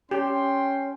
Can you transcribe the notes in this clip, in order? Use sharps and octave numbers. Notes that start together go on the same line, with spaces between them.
C#4 G4 G5 C6